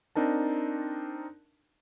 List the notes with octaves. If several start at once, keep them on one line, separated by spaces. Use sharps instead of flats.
C4 D4 D#4 A#4 A5